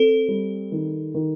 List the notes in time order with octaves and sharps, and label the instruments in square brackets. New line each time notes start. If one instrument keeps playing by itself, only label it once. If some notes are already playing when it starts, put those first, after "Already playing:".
Already playing: [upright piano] C4 [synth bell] A4
[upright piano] G3
D#3
D#3